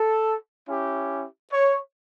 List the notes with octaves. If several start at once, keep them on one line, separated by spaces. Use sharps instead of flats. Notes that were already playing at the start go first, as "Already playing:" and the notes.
Already playing: A4
C#4 E4 G4
C#5